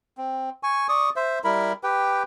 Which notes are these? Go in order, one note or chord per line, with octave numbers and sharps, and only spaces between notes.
C4
G#5 C#6
D5 C#6 D#6
C5 E5
G3 E4 A#4 B5
G4 B4 G5